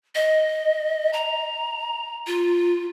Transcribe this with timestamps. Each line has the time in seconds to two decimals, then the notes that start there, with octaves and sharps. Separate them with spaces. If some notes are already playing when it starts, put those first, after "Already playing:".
0.15 D#5
1.13 A#5
2.27 F4